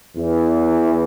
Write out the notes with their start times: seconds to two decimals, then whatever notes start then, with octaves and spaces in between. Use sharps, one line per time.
0.17 E2 E3